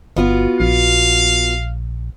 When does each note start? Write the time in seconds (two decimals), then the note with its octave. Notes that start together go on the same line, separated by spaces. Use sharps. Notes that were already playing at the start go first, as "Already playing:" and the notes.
0.16 G1 B3 F4 F#4
0.60 A#1 F5